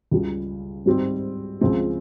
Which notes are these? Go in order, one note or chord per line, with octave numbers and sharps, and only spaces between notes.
C#2 C#3 G3
G#2 G3 C4 G4
C#2 C#3 F3 G#3 C4